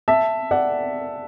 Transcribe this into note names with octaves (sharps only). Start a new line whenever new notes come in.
E5 A5
D5 F#5